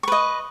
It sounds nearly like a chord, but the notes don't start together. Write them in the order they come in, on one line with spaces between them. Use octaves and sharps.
C#6 B4 D#5